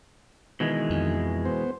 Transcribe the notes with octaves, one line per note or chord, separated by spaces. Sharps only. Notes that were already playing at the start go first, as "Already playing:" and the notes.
B2 D#3 E3 G#3
F2
B3 C5